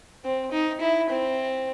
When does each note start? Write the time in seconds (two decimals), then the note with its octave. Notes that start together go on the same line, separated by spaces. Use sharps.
0.24 C4
0.51 D#4
0.80 E4
1.09 C4